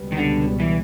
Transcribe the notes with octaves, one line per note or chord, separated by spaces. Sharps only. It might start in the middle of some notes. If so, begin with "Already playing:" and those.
Already playing: C#2 B2 G3 B3
D#3
D3
E3